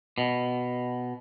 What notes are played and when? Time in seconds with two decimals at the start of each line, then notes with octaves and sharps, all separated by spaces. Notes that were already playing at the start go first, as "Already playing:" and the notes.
0.18 B2